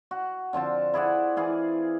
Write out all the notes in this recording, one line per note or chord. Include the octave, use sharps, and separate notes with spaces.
F#4
D3 F3 C4 A5
E4 G#4 D5 F#5
E3 G#4 F5